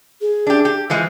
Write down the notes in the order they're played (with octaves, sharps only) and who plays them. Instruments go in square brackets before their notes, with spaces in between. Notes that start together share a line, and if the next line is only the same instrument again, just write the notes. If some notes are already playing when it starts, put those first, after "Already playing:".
[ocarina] G#4
[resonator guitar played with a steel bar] D4 G4
G4
E3 F3 G#3